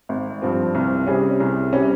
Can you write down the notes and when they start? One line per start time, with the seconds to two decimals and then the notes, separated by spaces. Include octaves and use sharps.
0.09 G#1
0.42 G2 F3 C4
0.75 C2
1.07 C3 G3 C#4 G#4
1.40 C2
1.73 C3 G3 C#4